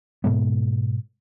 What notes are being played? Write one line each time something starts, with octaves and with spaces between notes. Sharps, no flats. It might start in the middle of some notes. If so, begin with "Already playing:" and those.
G#2 B2 G#3 B3